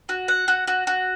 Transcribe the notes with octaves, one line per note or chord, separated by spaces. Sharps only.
F#4
F#5
F#4
F#4
F#4